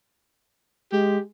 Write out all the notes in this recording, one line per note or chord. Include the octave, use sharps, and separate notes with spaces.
G#3 G4